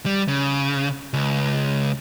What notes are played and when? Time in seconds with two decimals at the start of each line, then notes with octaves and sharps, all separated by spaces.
0.06 G3
0.28 C#3
1.13 C#2